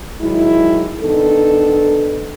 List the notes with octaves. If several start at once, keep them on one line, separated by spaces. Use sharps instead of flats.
D#3 F#3 G#3 E4
D#3 B3 D4 D#4 A4